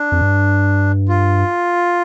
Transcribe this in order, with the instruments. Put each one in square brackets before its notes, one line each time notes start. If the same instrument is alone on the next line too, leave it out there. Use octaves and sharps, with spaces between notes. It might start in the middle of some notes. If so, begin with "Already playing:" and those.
Already playing: [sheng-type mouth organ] D4
[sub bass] F2
G2
[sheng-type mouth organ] F4